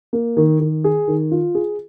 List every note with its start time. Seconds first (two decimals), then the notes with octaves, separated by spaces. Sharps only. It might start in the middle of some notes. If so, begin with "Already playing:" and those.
0.13 A#3
0.37 D#3
0.60 D#3
0.84 G#4
1.08 D#3
1.31 F4
1.55 G#4